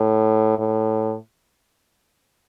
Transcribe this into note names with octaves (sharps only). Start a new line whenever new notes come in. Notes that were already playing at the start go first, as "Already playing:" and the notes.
Already playing: A2
A2